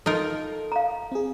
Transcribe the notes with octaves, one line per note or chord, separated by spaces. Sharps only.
D#4 F4 A4 A#4
F5 A#5
C4 G#4